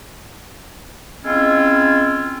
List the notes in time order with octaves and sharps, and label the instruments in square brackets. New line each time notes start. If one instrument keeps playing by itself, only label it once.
[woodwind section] G#3 C4 C#4 E4 F4